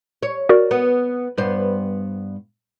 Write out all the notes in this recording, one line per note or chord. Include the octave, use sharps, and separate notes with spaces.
C#5
F#4 A#4 D5
B3
G2 B3 C5